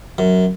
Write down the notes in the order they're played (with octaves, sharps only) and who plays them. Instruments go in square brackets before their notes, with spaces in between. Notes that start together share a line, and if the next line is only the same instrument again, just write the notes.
[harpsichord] F#2